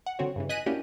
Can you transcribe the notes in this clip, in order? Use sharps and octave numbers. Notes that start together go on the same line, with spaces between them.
F#5
D3 F#3 C4 F#4 C#5
G2 C#3 E3
D#5 G#5 D#6 F#6 B6 D#7
F#3 A#3 C#4 D4 E4 G4